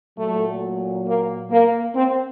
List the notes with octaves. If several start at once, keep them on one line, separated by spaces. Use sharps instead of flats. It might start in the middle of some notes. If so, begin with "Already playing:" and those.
A#2 F#3 A3
A#3
A#3
C4